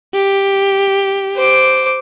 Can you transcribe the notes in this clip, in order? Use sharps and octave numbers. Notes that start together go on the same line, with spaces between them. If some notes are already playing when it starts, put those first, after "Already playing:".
G4
C5 D6